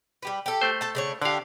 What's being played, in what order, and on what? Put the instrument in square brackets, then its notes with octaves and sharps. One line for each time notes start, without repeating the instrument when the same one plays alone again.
[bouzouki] G3 G4 B4
G4 A4
[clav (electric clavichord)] A3 C5
[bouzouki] A4 A5
C#3 D4 C#5
[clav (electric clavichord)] D3 F5 [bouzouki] D4 G4